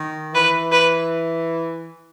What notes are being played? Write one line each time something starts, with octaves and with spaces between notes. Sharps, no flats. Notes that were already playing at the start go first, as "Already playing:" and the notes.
Already playing: D#3
E3 B4
B4